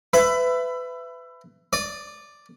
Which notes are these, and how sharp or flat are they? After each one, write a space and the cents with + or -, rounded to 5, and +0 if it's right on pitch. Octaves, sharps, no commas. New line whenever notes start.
B4 +25 E5 +20 B5 +20
D5 +0 D#6 -30